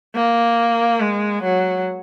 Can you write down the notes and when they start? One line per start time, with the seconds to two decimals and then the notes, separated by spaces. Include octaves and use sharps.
0.15 A#3
1.00 G#3
1.43 F#3